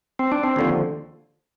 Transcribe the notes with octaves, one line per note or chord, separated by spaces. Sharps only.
C4
D4
C4
D#2 D3 F3